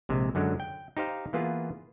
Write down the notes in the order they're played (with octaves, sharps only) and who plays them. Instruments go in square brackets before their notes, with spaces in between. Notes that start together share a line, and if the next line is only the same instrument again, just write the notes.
[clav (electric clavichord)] A#1 C3 G#3
F#2 D3 F#3 G#3
G5
D#4 G4 C5 F5
E3 A#3 B3 F4 G#4